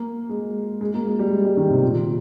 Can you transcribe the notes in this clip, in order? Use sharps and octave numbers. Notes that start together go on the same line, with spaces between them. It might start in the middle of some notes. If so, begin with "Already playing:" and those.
Already playing: A#3
G#3
G#3
A#3
G#3
G3
G#3
G3
D#3
C3
A#2